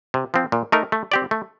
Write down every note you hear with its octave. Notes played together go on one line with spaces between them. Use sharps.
C3
F3 C4
A#2
A3 D#4 A#4
A3
C4 G4 D5
A3